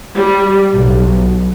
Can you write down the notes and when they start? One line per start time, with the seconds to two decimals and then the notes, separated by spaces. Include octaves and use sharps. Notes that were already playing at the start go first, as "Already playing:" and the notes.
0.16 G3
0.73 B1